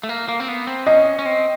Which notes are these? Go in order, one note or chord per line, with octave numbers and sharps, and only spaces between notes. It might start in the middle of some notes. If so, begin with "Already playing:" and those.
A3
A#3
A#3
C4
B3
C4
C#4 D#5
C#4
C4